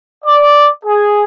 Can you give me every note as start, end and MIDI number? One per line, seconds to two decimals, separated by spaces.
0.24 0.68 74
0.86 1.23 68